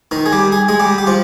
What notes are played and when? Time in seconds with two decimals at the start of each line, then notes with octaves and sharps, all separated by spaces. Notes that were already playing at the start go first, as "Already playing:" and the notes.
0.11 D#3 D#4
0.26 G#4
0.32 G3 G4
0.52 G#4
0.68 G#3 G#4
0.80 G3 G4
0.98 G4
1.07 F3 F4